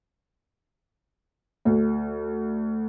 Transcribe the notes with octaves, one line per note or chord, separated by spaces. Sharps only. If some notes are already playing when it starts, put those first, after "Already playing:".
D2